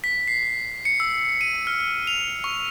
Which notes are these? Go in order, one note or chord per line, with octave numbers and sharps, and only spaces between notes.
B6
C7
C#7
E6
D#7
F6
F7
C#6